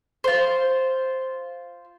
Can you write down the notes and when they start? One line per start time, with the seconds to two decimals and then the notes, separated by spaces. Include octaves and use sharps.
0.24 F4 C5